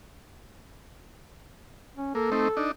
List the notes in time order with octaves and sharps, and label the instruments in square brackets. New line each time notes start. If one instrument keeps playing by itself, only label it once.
[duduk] C#4
[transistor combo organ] A#3 [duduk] A4
[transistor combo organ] A3 C4 D#4
D4 D#4